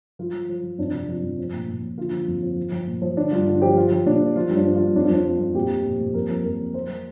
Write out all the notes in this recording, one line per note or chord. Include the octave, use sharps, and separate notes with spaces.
F3 F4
F3
F3
F3
F2 D4
C3
F3 F4
F2
F3
A#2
A#2
F3
D3 F4
F3
F2
F3
F3
F3
A#2
F3
D3 D4
G2 F4
D3 F4
F3 G4
F3 F4
F3
A#2 D4
F3
F3 F4
G2
D4
F3
F4
G2
F2 D4
F4
F2 D4
F3 F4
F2
A#2 G4
F3
A#2
A#2
F2 A#4
F3
F2 A#4
F3
F3 C5
F3